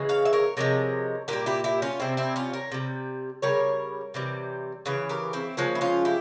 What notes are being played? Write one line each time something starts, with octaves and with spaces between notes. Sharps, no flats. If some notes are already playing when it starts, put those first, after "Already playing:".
Already playing: C#3 E3 G#3
C#5 F5
E5
A#4 C#5
C3 F3 G#3 A#4 C#5
A#2 G3 G4 A#4
E4 G4
E4 G4
C#4 F4
C3 G3 C4 E4
C4 E4
C#4 F4
A#4 C#5
C3 G3
C#3 G3 A#4 C#5
C3 E3 G3
C#3 E3 C#5
G4 A#4
C4 E4
C#3 F3 G#3 A#3 C#4
E4
C#4 F4
E4 G4